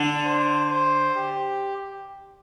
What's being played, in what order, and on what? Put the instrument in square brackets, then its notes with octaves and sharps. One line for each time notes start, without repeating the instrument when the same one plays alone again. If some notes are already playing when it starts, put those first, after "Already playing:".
Already playing: [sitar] D3 [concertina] D4
[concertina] C5
C5
G4